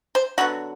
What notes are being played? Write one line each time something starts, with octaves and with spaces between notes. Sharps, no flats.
C5
D3 F#3 B3 F#4